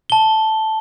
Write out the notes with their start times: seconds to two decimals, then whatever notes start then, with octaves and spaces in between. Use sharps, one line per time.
0.10 A5 G7